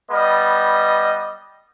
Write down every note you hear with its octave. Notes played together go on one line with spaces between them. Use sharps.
G3 B3 D#5